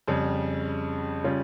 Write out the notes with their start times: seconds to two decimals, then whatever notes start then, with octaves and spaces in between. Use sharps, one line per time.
0.08 F2 C#3 G3
1.24 C#3 G3 C#4 F4